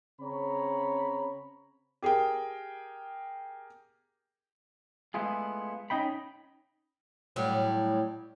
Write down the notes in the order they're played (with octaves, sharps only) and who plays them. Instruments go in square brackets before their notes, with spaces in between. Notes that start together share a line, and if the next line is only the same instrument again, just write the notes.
[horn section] C#3 C4 C#5 A#5 B5
[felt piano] G4 G#4 A#4 G5
[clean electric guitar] G#3 A3 B3 E4 F4 G#4
C#4 D#4 D#5 G5 B5
[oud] A2 F#3 G3